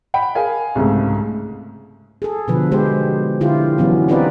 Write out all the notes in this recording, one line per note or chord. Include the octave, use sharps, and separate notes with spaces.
F#5 G5 B5
G#4 A#4 F5 G#5
C2 G#2 C#3 A3
G#4 A4
B2 D3 F3 B4
G#3 G4 C5
D3 E4 F4 G4
E3 F#3 B3 C#4
C4 D#4 F4 G4 B4 D5